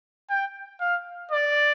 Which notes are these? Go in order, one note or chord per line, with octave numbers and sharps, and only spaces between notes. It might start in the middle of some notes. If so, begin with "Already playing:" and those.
G5
F5
D5